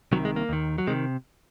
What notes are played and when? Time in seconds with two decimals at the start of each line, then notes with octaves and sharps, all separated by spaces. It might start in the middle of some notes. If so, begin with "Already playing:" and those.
0.12 C2 C3 D#3 F#3
0.25 G#3
0.36 A#3
0.49 D#2 D#3
0.78 F#3
0.87 C3 D#3 G#3